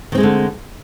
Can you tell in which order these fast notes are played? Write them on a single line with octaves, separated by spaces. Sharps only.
D#3 C4 G#3 A3 D3